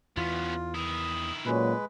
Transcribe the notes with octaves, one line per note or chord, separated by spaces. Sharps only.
E2 E3 B3 C#4 F4
D#3 E4 D#6
A#2 F#3 G#3 C#4 B4